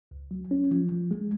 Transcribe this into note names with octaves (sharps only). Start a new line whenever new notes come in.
C#2
F#3
C#4
F3
F3
G#3